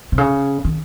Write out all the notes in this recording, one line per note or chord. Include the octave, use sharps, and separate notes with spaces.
C3
C#3
D#3